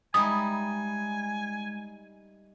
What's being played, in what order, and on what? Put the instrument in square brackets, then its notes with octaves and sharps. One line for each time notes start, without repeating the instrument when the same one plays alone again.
[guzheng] G3 D#4 E4 [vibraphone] G#3 [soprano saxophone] G#5 [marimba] D#6